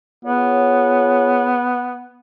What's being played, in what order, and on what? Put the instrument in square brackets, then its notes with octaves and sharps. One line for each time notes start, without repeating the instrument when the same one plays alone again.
[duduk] B3 [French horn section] F4 G#4 C#5